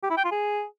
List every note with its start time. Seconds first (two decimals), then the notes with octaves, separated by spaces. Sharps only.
0.03 G4
0.10 E4
0.17 G5
0.24 F4
0.32 G#4